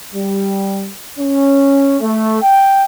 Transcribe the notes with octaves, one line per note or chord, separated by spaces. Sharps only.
G3
C#4
A3
G5